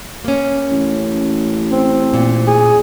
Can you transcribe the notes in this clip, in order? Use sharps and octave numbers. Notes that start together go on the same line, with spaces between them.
A#3 C#4
A1
C4
A#2
G#4